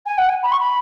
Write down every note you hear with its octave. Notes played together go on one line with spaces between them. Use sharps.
G#5
F#5
G#5
B5
C#6
B5